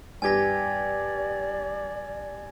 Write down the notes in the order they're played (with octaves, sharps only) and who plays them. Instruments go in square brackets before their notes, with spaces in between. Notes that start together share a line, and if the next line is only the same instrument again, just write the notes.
[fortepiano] G2 G4 [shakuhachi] D5 [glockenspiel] G#5 G#6 A#6